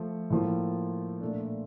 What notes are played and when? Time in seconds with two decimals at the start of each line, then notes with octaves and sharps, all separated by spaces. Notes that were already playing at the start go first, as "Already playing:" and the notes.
Already playing: F3 A3
0.30 A2 F3 A#3 F4
1.21 A#2 A3 D4